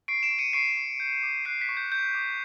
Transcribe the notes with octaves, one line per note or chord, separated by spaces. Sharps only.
C#6 C7 D7
D7 E7
C#6
C#7 D#7
C#6 C7 D7
C#6
G6
D6
F#6 C7
B6
C#6
G6
F#6 G6
D6